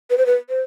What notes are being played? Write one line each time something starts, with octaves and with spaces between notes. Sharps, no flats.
B4
C5
B4
C5